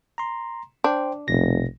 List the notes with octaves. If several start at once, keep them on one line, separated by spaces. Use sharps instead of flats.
A#5 C6
D4 C5 G5
F1 A#1 B2 A#6